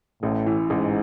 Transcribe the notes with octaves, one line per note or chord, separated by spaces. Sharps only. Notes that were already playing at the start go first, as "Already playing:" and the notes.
A1 A2
E3
A1 G#2